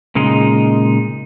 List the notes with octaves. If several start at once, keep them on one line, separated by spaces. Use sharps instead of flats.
A#2 C#3 G#3 D#4